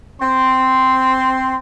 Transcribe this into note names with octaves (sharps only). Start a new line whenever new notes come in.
C4 C6